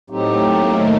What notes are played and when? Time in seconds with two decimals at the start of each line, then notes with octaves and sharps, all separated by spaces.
0.10 A2 F#3 A3 C4 D#4 G4
0.42 A#3
0.75 D#3 A3 D#4